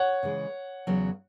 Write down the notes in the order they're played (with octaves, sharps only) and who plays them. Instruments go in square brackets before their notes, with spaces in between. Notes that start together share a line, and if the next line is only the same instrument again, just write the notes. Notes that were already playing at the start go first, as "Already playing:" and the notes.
Already playing: [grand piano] C#5 F#5
[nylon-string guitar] C#3 E3 G#3
E2 C#3 F#3